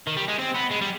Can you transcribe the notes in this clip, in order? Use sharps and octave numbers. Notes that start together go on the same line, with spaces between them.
D#3
G3
G#3
C4
B3
G#3
G3